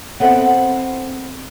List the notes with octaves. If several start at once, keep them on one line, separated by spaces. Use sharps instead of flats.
B3 C4 A4 E5 F#5